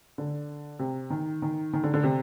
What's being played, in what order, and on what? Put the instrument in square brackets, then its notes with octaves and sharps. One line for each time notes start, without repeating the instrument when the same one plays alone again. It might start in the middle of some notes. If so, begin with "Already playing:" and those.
[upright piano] D3
C3
D#3
D#3
D#3
D3
D3
C3